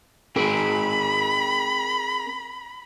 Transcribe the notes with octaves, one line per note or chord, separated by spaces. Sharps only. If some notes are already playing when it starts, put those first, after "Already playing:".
C4 G#4 A#4 B5